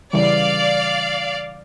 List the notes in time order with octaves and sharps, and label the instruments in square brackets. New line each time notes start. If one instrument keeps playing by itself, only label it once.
[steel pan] C#3 E3 G3 [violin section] D5 F5